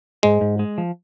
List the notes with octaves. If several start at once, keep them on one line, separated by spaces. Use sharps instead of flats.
G#2 G#3
G#2
G#3
F3